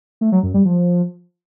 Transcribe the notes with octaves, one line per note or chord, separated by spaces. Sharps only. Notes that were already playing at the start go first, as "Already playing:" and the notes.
A3
F#3
F#2
G3
F3